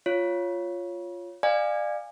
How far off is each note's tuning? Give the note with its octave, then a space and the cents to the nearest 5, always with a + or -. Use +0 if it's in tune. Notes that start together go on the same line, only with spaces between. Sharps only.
F4 +0 C#5 +0
D5 +30 F5 +0 G#5 -20